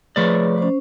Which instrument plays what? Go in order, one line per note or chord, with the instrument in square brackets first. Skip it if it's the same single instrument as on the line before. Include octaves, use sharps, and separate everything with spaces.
[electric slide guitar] F3 A3 D5 [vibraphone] G#4 B4 C#5
[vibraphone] C#4 C5